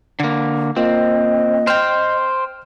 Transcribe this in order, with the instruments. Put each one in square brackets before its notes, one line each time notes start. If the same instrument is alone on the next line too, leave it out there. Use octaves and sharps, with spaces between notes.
[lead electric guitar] D3 A#3
[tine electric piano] A#3 F4 [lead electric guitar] C4 [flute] D#5
[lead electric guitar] C5 G5 [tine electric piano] F6